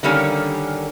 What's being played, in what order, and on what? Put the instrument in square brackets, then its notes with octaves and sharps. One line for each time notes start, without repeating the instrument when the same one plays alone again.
[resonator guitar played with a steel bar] D3 D#3 G3 A#3 C#4